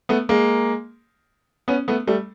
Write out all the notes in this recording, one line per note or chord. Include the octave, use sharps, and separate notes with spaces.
A3 B3
G#3 A#3
B3 C#4
A3 B3
G3 A3